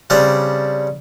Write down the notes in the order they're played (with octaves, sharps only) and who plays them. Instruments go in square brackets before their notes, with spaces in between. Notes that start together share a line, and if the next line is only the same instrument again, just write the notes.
[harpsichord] C#3 G3 C4 D4